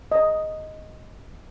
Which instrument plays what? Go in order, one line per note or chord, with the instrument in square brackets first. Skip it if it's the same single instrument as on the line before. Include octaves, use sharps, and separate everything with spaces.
[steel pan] D#5